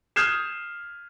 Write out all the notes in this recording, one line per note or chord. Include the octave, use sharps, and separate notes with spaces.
D#6 F6 G6 G#6 C7 E7